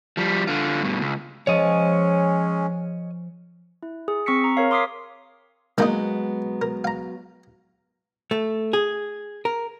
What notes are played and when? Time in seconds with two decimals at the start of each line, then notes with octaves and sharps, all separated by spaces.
0.17 F3 G3
0.47 D3 F4
0.82 G2 B2
1.01 C#2
1.47 F3 G#3 C#4 C#5 D#5
3.83 E4
4.08 G#4
4.26 C4 C#6 E6 B6 C#7
4.44 A#5
4.57 A#4 C#5 F5
4.71 C6 D6 D#6 B6 C7
5.78 D#3 F#3 G#3 A#3 B3 D#4
6.62 A#4
6.84 F5 A#5
8.31 A3
8.73 G#4
9.45 A#4